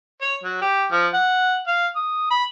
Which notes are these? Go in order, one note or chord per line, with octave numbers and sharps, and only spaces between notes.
C#5
F#3
G4
F3
F#5
F5
D#6
B5